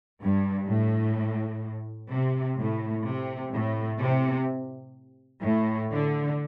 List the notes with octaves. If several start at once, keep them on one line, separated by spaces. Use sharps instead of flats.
G2
A2
C3
A2
C3
A2
C3
A2
D3